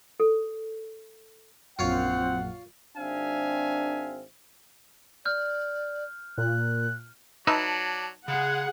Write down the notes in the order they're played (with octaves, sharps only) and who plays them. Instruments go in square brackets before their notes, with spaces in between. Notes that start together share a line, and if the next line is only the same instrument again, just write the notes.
[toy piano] A4
[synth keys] A#1 F#2 [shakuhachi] C4 [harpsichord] F4 C#5 F5 [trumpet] F#5
[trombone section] G#1 C4 [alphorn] D4 [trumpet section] E5 F5 G#5
[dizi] D5 [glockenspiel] F6 G6
[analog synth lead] A#2 [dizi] F#6
[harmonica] F#3 D5 [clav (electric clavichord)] D#4 B4 E5 [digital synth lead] A5
[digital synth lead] C#3 [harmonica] G#3 [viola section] G#4 F#5